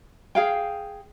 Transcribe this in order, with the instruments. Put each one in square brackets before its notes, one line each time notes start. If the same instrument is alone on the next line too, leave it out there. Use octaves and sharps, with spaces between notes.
[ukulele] G#4 F5 G5